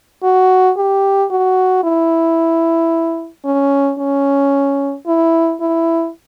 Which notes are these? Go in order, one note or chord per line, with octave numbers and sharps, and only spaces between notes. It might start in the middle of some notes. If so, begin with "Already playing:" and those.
F#4
G4
F#4
E4
C#4
C#4
E4
E4